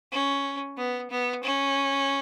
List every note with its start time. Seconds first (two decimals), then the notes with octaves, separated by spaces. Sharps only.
0.12 C#4
0.77 B3
1.11 B3
1.43 C#4